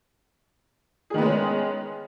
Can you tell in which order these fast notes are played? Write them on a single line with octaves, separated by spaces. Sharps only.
G#4 D#3 B3 G#3 C#4